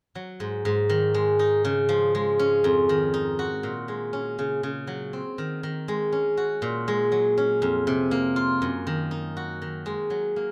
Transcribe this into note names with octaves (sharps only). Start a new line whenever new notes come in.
F#3
G#2
G#2
D#3
G#3
D#4
C#3
F3
G#3
C#4
F2
D#3
D#4
F#4
A#2
G#3
C#4
C#3
C#3
F#3
C4
D#3
D#3
G#3
C#4
F#4
A#2
G#3
F#3
C#4
F2
C3
A#3
F4
F#2
D#3
D#4
F#4
D#3
G#3
F#3
A#3